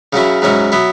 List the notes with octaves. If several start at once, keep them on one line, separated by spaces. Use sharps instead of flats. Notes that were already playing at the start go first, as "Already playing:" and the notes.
C#3 F#3 C#4 E4
G#2 F#3 C#4 E4
F#3 B3 E4